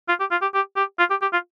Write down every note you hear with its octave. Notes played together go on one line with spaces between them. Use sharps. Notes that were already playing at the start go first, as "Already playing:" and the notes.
F4
G4
F4
G4
G4
G4
F4
G4
G4
F4